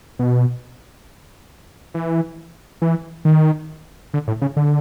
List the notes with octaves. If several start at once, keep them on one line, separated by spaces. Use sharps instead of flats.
B2
E3
E3
D#3
D3
A2
C#3
D3